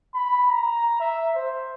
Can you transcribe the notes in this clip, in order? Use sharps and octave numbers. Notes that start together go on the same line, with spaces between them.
B5
A#5
E5
C5